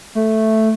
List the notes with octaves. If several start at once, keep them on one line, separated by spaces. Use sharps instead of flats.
A3